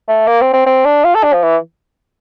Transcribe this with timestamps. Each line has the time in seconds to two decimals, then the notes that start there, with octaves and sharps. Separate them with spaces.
0.08 A3
0.27 A#3
0.41 C4
0.53 C4
0.66 C4
0.85 D4
1.04 F4
1.15 A4
1.24 D4
1.33 F3
1.43 E3